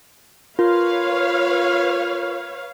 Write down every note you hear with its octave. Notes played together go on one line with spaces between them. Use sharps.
F4 A#4 B4 C#5 F5